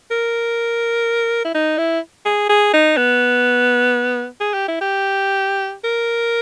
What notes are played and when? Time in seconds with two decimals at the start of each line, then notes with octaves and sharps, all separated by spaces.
0.11 A#4
1.45 E4
1.54 D#4
1.78 E4
2.25 G#4
2.49 G#4
2.73 D#4
2.97 B3
4.41 G#4
4.54 G4
4.68 E4
4.81 G4
5.84 A#4